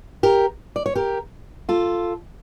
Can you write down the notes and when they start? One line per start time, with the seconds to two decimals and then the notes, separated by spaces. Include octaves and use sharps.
0.23 G4 A#4
0.76 D5
0.86 C#5
0.95 G4 A#4
1.69 F4 A4